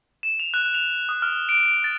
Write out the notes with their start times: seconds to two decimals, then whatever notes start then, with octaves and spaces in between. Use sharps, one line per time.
0.23 E7
0.40 F7
0.54 F#6
0.74 F7
1.09 D#6
1.22 F6
1.49 D7
1.84 A6